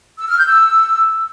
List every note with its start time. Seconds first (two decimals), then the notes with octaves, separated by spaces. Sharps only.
0.18 E6
0.28 F6
0.38 G6
0.48 E6